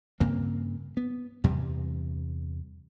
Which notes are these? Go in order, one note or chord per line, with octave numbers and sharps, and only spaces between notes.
G2 C#3 A#3 C4
B3
E2 G2 C3 G3